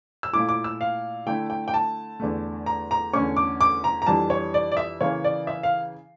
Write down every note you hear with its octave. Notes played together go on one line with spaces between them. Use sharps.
E6
A#2 A3 E4 D6
D6
E6
F5
D3 A3 E4 G5
G5
G5
A5
E2 D3 A3
A#5
A#5
E2 D3 A3 C#4 C#6
D6
D6
A#5
A#5
F2 E3 G3 D4 A5
C#5
D5
D5
E5
C#3 E3 A#3 C#5
D5
E5
F5